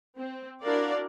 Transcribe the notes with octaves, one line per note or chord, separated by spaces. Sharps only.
C4
D4 E4 F#4 A#4 D5 F5